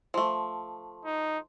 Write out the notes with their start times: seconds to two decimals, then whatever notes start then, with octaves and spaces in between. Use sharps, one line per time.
0.14 F3 A3
1.05 D#4